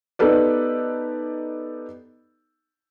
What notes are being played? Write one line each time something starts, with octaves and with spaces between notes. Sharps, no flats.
B3 D#4 G4 A4 B4 D5